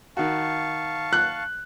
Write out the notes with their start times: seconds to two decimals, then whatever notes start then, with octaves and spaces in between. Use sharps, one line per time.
0.17 D#3 F#4 F5 A5 C#6
1.13 F#6